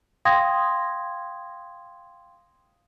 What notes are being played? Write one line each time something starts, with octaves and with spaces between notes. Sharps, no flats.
F5 G5 C6 D#6 G#6 A#6